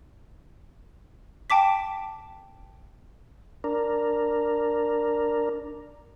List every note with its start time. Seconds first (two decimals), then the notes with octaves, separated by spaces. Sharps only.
1.50 G5 A5 D6 B6
3.64 D4 A#4